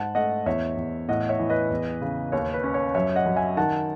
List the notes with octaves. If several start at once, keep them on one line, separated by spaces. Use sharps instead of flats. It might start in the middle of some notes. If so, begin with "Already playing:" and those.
Already playing: G#2 F#5 A5
A3 D#5 F#5
E2 C#5 E5
E2
A2 D#5 F#5
C#5 E5
E3
B4 D#5
E2
C#3
D#2 C#5
B4
C#4
C#5
F#2 C#5 E5
D#5 F#5
F#2
E5 G#5
D#3 F#5 A5